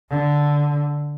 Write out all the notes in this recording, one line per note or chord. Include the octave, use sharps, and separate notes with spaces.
D3